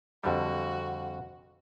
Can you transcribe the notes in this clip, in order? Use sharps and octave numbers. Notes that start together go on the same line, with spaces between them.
F2 D3 G3 F#4